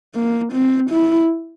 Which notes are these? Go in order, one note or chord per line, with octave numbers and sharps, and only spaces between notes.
A#3
C4
E4